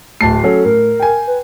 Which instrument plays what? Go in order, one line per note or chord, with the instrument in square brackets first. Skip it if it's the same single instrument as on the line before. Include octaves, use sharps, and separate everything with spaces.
[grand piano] D1 A5 C7 [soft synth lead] A3
[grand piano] F#3 C#4 [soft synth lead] A4
[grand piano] A2 [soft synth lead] A#4
[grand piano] G5 G#5
[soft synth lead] B4